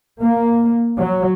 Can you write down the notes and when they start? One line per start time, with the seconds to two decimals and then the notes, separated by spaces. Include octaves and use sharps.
0.21 A#3
0.99 F#3